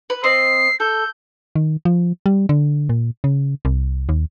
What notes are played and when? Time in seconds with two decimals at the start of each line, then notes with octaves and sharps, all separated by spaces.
0.10 B4
0.24 C4 D#5 C7
0.80 A4 G6
1.55 D#3
1.85 F3
2.26 G3
2.49 D3
2.89 A#2
3.24 C#3
3.65 C2
4.09 D#2